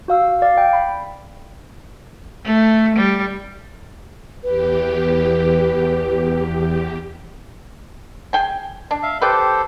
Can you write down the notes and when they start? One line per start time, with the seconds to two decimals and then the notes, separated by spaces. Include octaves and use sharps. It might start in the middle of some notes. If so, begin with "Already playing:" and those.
0.08 F#4 F5 E6
0.42 D5 F5
0.58 G5
0.73 B5
2.44 A3
2.97 G3
4.44 E2 G4 B4
8.33 G#4 G5 G#5
8.91 D4
9.03 E5 F5
9.22 G4 A4 B4 C5 D5 G5